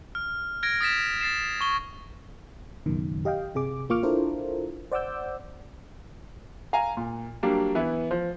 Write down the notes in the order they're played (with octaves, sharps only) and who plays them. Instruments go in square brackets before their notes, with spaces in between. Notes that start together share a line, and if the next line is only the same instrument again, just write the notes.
[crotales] F6
F6 G#6 A#6 D7
D#6 A6 B6 E7
A6 C7 E7
C#6 G7
[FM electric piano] C#2 F#2 B2 D#3
G4 D#5 F5 G5
G1 C3 G#4 D6
A1 A#3 F4 C#6 D6 F6
D4 E4 F4 A4 A#4 C5
C5 D5 F#5 D6 E6 G6
[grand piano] F5 G#5 A#5
A#2
F#3 G3 A#3 D4
E3 B3 E4
F3